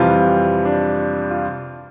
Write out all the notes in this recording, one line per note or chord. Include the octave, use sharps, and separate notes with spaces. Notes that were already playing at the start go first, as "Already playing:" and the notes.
Already playing: F2 C3 E3 G3 F4
D4
F4